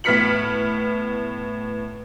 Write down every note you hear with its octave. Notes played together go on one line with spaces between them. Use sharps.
A2 B3 F6 B6 C#7 F#7